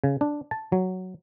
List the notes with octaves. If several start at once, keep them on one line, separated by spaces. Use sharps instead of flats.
C#3
D4
A5
F#3